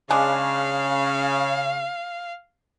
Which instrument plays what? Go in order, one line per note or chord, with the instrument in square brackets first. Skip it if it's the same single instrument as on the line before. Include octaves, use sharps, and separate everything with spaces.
[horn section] C#3 [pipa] G#3 D4 [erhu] F5